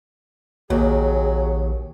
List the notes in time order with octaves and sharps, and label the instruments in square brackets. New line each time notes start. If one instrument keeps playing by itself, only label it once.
[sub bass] A#1 [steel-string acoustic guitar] D#2 [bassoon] F#3 [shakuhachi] G#4